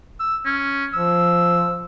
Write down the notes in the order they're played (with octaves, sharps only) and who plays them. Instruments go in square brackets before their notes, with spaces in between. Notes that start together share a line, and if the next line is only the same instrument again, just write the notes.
[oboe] E6
C#4
[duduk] F3 [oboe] E6